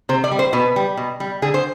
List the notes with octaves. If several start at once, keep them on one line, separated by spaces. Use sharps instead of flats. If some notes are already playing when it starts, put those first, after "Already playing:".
C3 C5
D5
G3
C5
B2 B4
G3
B2
G3
D3 G#4
C5